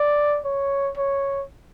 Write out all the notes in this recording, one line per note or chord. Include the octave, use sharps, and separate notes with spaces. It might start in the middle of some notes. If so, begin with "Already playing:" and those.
Already playing: D5
C#5
C#5